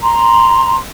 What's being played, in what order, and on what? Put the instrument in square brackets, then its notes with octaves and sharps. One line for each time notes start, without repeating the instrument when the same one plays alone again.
[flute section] A#5 C6